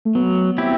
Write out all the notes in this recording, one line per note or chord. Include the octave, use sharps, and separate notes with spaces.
A3
F#3 B3
C4 E4 G4